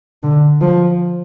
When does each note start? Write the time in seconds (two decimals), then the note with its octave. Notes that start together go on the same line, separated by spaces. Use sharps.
0.23 D3
0.61 F3